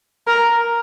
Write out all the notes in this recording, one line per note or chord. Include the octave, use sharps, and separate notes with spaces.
A#4